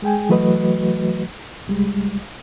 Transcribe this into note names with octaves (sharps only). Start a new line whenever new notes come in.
G#3 G#4 G5 G#5
E3 F#3 A3 F#4 B4 D#5
C2 G3 G#3